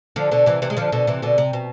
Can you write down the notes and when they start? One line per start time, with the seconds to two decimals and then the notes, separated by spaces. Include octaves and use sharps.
0.16 D3 F3
0.31 B2 D3
0.46 C3 E3
0.62 C3 E3
0.70 G#3
0.77 D3 F3
0.92 B2 D3
1.07 C3 E3
1.22 B2 D3
1.38 C3
1.53 B2